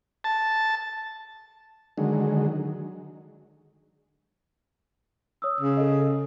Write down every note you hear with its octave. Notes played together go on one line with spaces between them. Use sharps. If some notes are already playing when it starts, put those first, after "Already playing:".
A5
D3 D#3 F#3 G#3
C#5 D#6 E6
C#3
A4 D#5